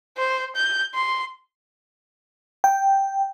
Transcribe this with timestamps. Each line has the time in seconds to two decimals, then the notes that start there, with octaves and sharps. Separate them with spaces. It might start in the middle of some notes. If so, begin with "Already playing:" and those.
0.18 C5
0.55 G6
0.94 C6
2.64 G5